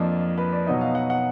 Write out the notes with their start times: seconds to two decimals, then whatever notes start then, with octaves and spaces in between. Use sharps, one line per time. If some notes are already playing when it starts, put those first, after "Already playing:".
Already playing: F2 F3 A#3 D4 D#5
0.38 B4
0.53 D5
0.66 B2 F#3 B3 D#4 D#5
0.81 F5
0.95 F#5
1.10 F#5